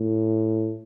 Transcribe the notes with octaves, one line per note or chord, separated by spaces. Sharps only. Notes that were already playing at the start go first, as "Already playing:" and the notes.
Already playing: A2